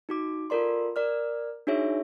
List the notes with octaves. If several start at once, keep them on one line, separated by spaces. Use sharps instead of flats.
D#4 F#4 D6
F4 A4 A#4 D5 C6
A#4 D5 F6
D4 D#4 F#4 G#4 C#5 E5